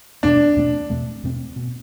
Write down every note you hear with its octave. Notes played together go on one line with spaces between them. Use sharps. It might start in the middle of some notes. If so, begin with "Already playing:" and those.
E2 B2 A3 C4 D4
E2 B2 A3 C4
E2 B2 A3 C4
E2 B2 A3 C4
B2